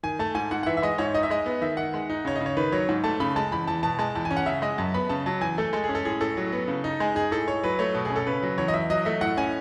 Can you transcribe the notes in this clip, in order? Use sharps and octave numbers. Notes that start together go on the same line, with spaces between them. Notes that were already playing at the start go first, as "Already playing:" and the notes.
D#3 G#5
A3 A5
G#2 G#5
G#2 F#5
F#5
E3 E5
E5
G#3 D#5
G#2 C#5
D#4 D#5
E5
G#3 D#5
B3
D#3 E5
D#3 F#5
G#3
D#4
C#3 C#5
D#5
C#3
C#5
D#3 B4
F#3 C#5
G#2
A3 A5
C#3 B5
G#3 A5
E2 B5
E2 A5
B2 A5
G#3 A5
E2 A5
G#5
C#4
F#5
C#3 E5
G#3 D#5
F#2 A5
B3 B5
C#3 A5
F#3 A5
E2 G#5
A3 A4
G#3 A4
G#4
C#4
A4
A2 G#4
A2 A4
F#3
B3
C#3
D#4
G#3 G#4
D#4 G#4
A2 A4
A2 C#5
F#3 B4
A3 C#5
B2
C#4 G#4
A4
C#3 B4
F#3
E2 C#5
D#5
E2 E5
F#3 D#5
A3 E5
A2 F#5
C#4 G#5